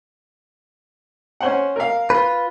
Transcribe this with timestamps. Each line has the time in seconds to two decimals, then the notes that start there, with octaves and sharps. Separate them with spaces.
1.41 C#4 C5 F#5
1.76 A#4 F5
2.10 F4 B4